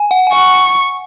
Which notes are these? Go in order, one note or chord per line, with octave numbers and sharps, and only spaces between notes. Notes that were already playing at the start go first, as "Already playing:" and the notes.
Already playing: G#5
F#5
G#5
F#5 C#6